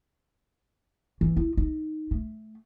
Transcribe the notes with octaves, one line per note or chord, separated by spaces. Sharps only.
E3
E4
D#4
A3